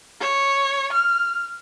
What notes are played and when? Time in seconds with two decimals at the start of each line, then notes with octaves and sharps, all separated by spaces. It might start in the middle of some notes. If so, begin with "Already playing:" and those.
0.20 C#5
0.93 F6